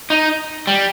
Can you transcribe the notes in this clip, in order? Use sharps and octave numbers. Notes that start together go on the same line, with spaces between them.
D#4
G3